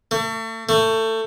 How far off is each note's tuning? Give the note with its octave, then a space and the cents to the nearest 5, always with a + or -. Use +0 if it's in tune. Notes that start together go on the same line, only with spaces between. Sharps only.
A3 +35
A3 +20